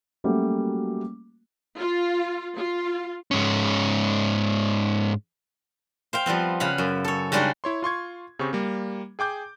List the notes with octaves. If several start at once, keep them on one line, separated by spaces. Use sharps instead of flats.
F#3 G3 A3 A#3 C#4 F#4
F4
F4
G#2 C#4
C5 F5 G5
F3 G3 B3 C4
C#3 F5 F#5 B5
F#2
A4 C#5
C#3 G3 G#3 D4 D#4 F#4
E4 C#5 C6
F4 C6 C#6 G#6
C#3 C4 G4 C#6
G3 A#3
G#4 G5 D6 G6